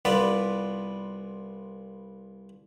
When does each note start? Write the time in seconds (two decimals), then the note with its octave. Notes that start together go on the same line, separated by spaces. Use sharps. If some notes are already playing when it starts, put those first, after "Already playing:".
0.05 C2 B3 F4 B4 D5